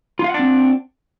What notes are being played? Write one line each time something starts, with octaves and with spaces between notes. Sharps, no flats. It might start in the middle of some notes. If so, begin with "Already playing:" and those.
C4 D4 F4 F5 F#5